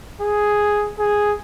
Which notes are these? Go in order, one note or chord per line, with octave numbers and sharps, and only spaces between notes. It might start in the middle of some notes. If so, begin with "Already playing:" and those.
G#4
G#4